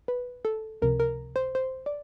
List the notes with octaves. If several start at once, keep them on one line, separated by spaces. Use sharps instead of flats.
B4
A4
C#2 C3 F3 A#4
A#4
C5
C5
D5